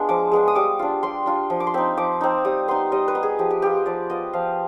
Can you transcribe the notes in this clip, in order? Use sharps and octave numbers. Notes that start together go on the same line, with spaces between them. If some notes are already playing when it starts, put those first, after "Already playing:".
Already playing: G#3 B3 D4 F4
F3 D6
G#3 B3 D4
D#6
G3 D6
D4 F4
G3 C6
D4 F4
F3
D6
C6
C4 D#4 B5
F3 D6
C4 D#4
G3 D#6
B3 D#4 C6
G3 D#5
B4
B3 D#4
G#4
F3 G4
G4
B3 F4 G4
F3 D5
B3 F4 D#5
F3 F5